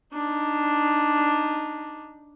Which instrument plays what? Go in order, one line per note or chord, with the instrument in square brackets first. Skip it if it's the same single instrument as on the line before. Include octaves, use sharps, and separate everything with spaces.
[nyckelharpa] D4 D#4